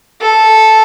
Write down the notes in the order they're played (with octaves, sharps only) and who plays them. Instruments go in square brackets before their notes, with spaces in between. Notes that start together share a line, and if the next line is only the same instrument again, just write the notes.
[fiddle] A4